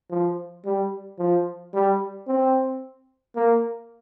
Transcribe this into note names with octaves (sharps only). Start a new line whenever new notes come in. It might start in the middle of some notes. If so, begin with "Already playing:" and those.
F3
G3
F3
G3
C4
A#3